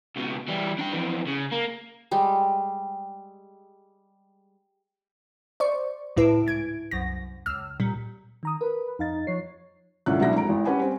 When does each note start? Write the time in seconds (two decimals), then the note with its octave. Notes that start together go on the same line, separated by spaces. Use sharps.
0.16 C#2 B2
0.48 E3 G3
0.79 D4 G5
0.92 F2 E3
1.27 C#3
1.51 A#3
2.11 G3 G#3
5.60 C5 D5 C#6
6.17 C#2 A2 E4 B4 D7
6.46 G#2 G#6 D7
6.91 C2 F#2 A#6
7.46 C#2 E6 F6
7.80 A#2 G3
8.43 D#3 A#5 D#6
8.61 A#4 B4
8.99 F2 D#4 F5 A6
9.27 F3 C#5 C7
10.06 C2 A2 D3 C#4 F4 F#6
10.19 E1 B2 F#3 D4 E4 A#6
10.35 F2 G#2 A#5 D7
10.49 G#1 E3
10.65 C#4 G4 B4 F#5 G#5 B5
10.79 G3 C4